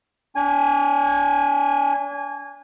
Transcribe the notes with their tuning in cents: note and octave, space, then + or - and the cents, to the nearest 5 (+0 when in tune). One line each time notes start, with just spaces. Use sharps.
D4 -45 G#5 -20